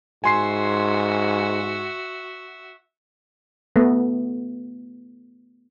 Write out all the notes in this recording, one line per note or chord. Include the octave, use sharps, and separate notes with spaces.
G#2 F#4 E5 G#5 C6 C7
A3 B3